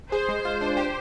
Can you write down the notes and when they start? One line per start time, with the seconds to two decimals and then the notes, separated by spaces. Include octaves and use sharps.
0.12 G#4 C5
0.29 G#3
0.45 F4
0.61 D4
0.77 G4